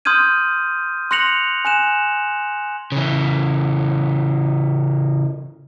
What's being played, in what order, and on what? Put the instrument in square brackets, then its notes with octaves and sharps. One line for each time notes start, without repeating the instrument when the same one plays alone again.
[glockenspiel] C6 D#6 F6 G6 G#6 D#7
C6 F#6 A#6 C#7 F7 F#7
G#5 F#6 E7
[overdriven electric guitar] C#3 E3